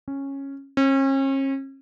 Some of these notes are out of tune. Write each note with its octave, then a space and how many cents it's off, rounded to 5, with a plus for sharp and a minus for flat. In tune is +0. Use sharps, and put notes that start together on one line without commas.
C#4 -10
C#4 -40